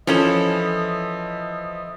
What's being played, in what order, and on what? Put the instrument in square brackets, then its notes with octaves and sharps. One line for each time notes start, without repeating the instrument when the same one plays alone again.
[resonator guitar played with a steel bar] E3 C#4 A4 [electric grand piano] F3 [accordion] D#5 E5